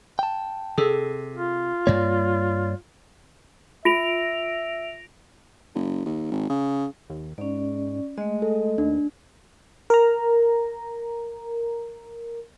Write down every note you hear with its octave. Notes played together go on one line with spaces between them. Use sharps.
G5 A5
C3 G#4 A4
F4
G2 A#3 C#5 D5
F4 E5 A#6 D7 F7
F#1
D#2
G#1
C#3
D#2
G#2 C#4 D5
G#3 A3 D#5
A4
D#2 D4
A#4 A#5